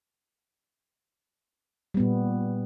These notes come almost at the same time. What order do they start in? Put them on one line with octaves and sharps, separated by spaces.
G3 B3 A#2